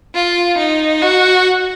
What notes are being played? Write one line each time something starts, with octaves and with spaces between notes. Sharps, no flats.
F4
D#4
F#4